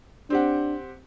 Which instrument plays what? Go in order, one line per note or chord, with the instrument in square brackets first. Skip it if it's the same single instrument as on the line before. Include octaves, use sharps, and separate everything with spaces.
[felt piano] C4 G4 F#5 [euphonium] D4